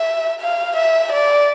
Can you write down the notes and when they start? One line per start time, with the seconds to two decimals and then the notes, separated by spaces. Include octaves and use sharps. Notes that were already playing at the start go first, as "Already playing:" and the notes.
Already playing: E5
0.41 F5
0.77 E5
1.13 D5